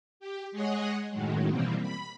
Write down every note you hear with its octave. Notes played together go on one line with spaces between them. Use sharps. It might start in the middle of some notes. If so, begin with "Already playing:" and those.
G4
G#3 G#4 C#5 D#5 F#5
F#2 A2 D#3 F#3 G#3
B2 E3 G3 A#3 C4
B5